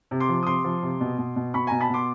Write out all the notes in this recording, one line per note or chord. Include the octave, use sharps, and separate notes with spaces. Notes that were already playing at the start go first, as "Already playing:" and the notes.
C3
C6 D6
F3
D#6
C3 C6 D6
F3
C3
B2
B2
B2
B2 B5 C#6
B2 G#5 A#5
A5 B5
B2 C6 D6